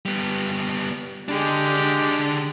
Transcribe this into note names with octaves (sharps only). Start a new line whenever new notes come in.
G3 B3
D3 G#3 D4 G4